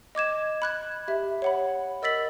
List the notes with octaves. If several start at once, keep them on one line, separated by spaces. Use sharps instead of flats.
D#5 D6 G#6 E7
B5 F#6 G#6
G4 E5
C#5 F#5 B5
A#4 D#5 E6 A6 B6 F#7